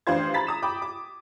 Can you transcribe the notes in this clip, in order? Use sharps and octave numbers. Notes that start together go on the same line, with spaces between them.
A1 D4 F4 C5 G#6
A#5 B5 A6 B6
A#5 D#6 E7
G5 B5 D6
D6